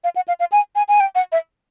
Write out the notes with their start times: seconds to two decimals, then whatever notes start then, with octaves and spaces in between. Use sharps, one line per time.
0.04 F5
0.16 F#5
0.28 F5
0.40 F5
0.52 G#5
0.75 G#5
0.88 G#5
1.00 G5
1.15 F#5
1.32 E5